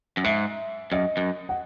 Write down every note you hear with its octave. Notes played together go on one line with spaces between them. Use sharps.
F#2
G#2 E5
F#2 D#5
F#2
F#5